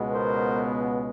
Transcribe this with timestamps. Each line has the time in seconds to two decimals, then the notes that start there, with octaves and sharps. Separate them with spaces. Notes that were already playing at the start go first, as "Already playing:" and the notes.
Already playing: C#2 B2 G#3 B3
0.11 A#4 C5